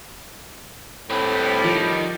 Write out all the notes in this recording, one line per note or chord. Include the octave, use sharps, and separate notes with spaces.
A2 G3 C4 B4
D#3 F3